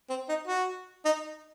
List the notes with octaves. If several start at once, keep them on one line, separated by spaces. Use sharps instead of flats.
C4
D#4
F#4
D#4